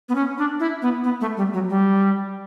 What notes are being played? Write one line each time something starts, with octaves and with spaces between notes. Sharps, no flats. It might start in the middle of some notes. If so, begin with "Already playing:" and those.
B3
C#4
D4
E4
B3
B3
A3
G3
F#3
G3